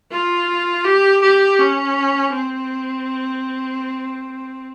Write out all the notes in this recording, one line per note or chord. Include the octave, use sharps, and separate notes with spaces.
F4
G4
G4
C#4
C4